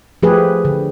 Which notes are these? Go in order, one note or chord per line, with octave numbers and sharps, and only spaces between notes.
F3 A3 G4 G#4 B4
D3